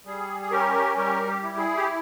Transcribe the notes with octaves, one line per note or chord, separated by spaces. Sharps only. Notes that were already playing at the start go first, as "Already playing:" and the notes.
G3 G#4
G#4
C#4 G4 A#4
G3 G4 A#4
G4
E4
G#4
G4